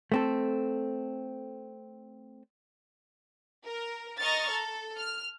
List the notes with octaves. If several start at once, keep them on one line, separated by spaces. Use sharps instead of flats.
A3 C4 A4
A#4
D#5 A#5 C#6 F6 A6
A4
F6